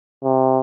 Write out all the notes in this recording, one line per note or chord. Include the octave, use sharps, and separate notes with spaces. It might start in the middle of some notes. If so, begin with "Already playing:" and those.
C3